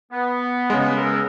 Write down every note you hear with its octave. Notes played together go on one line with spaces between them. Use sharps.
B3
C#3 G#3
C#2 A#4 E6